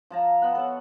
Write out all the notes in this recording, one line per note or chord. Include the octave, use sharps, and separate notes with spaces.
F3 A5 A#5
B3 D#5 F#5
A4 C#5 A5